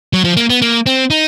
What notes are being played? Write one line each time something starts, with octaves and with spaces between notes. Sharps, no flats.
F#3
F3
A#3
B3
A#3
C4
D#4